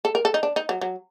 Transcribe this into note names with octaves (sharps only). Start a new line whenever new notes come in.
A4
A#4
A4
D#4
D4
D#4
F#3
F#3